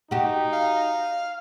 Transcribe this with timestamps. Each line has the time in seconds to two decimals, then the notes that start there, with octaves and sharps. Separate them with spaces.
0.11 D#4 F#4 G4
0.53 F5